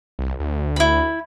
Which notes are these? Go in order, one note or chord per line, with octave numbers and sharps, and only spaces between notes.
C2
D2
E4 B5